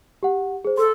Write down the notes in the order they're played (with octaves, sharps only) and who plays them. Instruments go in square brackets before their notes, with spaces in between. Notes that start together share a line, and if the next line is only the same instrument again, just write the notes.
[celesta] G4 F#5
G#4 C5
[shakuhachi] A4 [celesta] C6